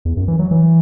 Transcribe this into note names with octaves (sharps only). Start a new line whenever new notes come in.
E2
F#2
E3
F#3
E3